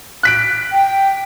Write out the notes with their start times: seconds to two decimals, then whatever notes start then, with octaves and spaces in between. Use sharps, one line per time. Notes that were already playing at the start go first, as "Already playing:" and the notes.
0.23 F#6 B6 D7
0.72 G5